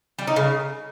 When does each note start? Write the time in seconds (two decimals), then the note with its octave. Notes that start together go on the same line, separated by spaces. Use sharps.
0.19 G3
0.27 D#4
0.36 C#3